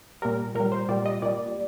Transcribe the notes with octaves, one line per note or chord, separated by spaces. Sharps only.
A#2 G3 A#4
A#2 G3 A#4
C5
A#2 G3 D5
D#5
A#2 G3 D5